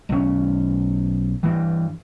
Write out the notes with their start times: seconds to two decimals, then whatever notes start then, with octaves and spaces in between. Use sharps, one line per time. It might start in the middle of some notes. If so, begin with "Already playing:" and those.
0.09 B1 C#4
1.43 G2 E3